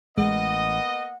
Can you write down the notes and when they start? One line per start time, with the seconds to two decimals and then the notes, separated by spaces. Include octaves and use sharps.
0.18 A1 G#3 A#3 B3 D#5 F#5